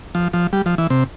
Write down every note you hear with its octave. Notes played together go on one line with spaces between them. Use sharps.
F3
F3
G3
F3
E3
C3